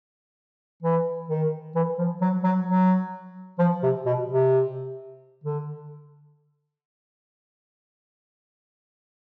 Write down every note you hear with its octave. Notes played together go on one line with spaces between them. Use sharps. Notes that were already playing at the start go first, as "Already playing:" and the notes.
E3
D#3
E3
F3
F#3
F#3
F#3
F3
C3
B2
C3
D3